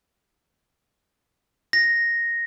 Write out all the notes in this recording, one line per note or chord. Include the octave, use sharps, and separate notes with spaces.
A#6